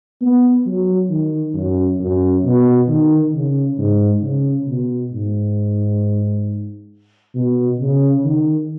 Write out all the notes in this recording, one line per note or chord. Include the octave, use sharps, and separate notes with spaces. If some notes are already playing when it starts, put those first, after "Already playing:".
B3
F#3
D#3
F#2
F#2
B2
D#3
C#3
G#2
C#3
B2
G#2
B2
C#3
D#3